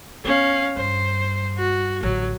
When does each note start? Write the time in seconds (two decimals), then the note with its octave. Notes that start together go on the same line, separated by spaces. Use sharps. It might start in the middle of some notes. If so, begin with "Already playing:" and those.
0.25 B3 C#4 F5
0.77 G2 C5
1.57 F#4
2.03 A1 D3 F#3